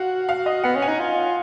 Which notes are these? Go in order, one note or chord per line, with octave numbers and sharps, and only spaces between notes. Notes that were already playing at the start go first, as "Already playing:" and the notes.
Already playing: F#4 F5 F#5
F5
D#5
B3 F#5
C#4
G#5
D#4
F4